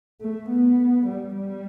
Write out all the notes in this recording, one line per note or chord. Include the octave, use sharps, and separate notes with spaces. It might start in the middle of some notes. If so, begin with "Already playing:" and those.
A3
B3
G3
G3